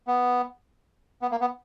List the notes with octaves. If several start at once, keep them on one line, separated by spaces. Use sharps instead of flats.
B3
B3
A#3
B3